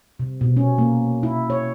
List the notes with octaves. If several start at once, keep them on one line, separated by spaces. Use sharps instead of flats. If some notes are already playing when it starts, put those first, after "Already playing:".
C3
B2
C#4
A#3
E4
C#5